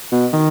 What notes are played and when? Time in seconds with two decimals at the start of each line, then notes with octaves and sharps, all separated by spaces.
0.12 B2
0.33 D#3